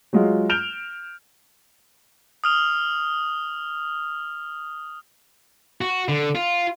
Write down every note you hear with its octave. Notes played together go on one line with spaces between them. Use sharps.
F#3 G#3 F4
F6 G6 D7 E7 F7 G7
D#6 F6 F7
F#4
D3
F4